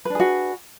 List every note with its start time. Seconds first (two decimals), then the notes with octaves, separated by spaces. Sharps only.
0.05 B4
0.10 D4
0.15 G#4
0.20 F#4